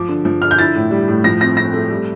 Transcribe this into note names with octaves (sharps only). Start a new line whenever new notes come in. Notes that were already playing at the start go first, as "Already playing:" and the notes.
Already playing: F3 D6
D3
F3
D3 F6
G6
E4 A6
A2
G3
A2
F3 A#6
C4 A#6
C4 A#6
A3
G3